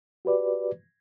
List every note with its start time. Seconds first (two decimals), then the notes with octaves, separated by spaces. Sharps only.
0.25 F#4 G4 B4 D5